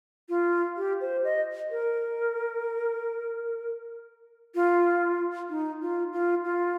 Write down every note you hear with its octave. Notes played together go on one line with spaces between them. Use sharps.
F4
G4
C5
D#5
A#4
F4
D#4
F4
F4
F4